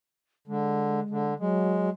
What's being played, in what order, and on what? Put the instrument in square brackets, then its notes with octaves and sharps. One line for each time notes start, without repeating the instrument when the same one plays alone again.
[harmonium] D3 [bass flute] G#3
[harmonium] D3
[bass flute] F#3 [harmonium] G#3